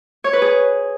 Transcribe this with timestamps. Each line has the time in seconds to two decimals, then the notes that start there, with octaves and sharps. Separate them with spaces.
0.24 C#5
0.33 B4
0.42 G#4